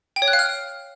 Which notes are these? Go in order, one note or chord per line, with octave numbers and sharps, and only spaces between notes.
G5
C#5
F#6
F5
F6